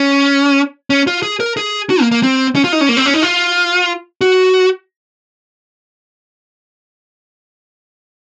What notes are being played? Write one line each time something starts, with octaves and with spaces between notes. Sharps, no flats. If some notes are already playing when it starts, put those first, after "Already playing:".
Already playing: C#4
C#4
F4
G#4
A#4
G#4
F#4
A#3
A#3
C4
C#4
F4
D#4
C#4
A#3
C4
C#4
D#4
F4
F#4